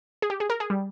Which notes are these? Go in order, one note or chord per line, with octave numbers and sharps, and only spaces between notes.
G#4
G4
G#4
A#4
G#4
G3